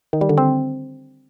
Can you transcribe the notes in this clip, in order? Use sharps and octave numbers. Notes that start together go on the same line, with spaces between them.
D#3
G3
D3
C4